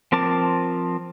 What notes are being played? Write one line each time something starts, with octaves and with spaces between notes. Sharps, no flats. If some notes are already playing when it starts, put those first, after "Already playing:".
F3 C4 A#4 A5 D6